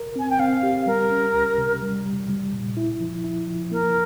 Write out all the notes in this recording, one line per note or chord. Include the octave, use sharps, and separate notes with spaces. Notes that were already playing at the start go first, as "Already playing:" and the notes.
Already playing: A#4
C4 G#5
G5
C4 F5
G4
G3 A#4
C#4
C#2
C3
G3
G3
G3
A#2
E4
F3
E4
F3
A#3 A#4